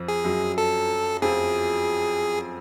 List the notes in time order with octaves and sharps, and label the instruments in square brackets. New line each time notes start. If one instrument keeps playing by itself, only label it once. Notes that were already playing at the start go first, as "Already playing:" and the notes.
Already playing: [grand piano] F2 F3
[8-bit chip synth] G#4
[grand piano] F#2 F#3
[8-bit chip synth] A4
[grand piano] F2 F3 [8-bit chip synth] G#4